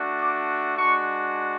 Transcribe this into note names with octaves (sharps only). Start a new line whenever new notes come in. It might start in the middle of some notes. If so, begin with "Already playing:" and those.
Already playing: A3 D4 F#4
D6
G#3 D4 F#4 C#6